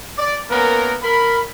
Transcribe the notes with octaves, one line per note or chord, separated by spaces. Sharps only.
D5
A#3 B3 C#4 A#4
A#4 B5